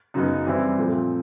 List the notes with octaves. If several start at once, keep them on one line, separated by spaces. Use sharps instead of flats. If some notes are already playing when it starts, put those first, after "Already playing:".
F#2 C#3 F#3 B3 D#4
E3 G3 C4 E4
A#2 F3 A3 C4